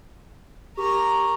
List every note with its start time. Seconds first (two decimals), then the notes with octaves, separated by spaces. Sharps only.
0.77 G4 A#4 A#5 C#6